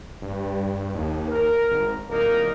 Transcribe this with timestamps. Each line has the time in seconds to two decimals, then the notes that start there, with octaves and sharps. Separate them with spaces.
0.22 G2
0.95 D#2
1.28 A#4
1.71 G#1
2.10 D1 A#3 D#4 A#4